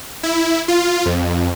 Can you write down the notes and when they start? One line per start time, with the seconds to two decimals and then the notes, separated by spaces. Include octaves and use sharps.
0.23 E4
0.68 F4
1.06 F2